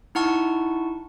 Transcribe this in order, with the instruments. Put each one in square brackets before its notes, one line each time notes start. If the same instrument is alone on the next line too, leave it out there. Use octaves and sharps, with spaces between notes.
[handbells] D#4 E4 F#5 A5 C#6